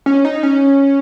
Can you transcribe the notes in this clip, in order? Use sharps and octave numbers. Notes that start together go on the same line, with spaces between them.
C#4
D#4
C#4